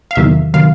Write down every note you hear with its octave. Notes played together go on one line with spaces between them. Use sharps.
F5
E2 C3 D#3 F#3 E5
C3 D#3 F#3 F5